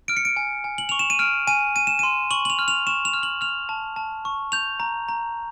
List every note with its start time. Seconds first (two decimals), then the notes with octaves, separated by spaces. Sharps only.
0.08 F6 D7
0.17 C#7
0.25 D7
0.37 G#5
0.64 G#5
0.78 F#7
0.89 C#6 F7
0.99 E7
1.10 D#7
1.19 F6 D7
1.47 G#5 D#7
1.75 G#5 D#7
1.87 E7
1.99 C6 D#7
2.31 C#6 F#7
2.45 F#7
2.50 F7
2.59 F6
2.68 F7
2.87 C#6 E7
3.05 F7
3.14 F6
3.23 F#7
3.41 F6 F7
3.69 A5
3.96 A5
4.25 C#6
4.52 G6 F7
4.80 A#5
5.08 A#5